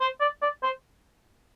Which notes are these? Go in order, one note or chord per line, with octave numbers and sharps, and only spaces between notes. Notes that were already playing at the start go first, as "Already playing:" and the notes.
C5
D5
D5
C5